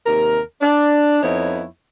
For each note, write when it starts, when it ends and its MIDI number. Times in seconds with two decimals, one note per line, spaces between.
0.06 0.41 39
0.06 0.41 48
0.06 0.41 70
0.61 1.22 62
1.23 1.65 41
1.23 1.65 59
1.23 1.65 63
1.23 1.65 64
1.23 1.65 73